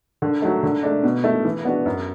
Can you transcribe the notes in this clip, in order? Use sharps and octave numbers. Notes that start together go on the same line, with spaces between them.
D3
F#3 A3
D3
A3 D4
B2
A3 E4
E3
B3 D4 F#4
F#2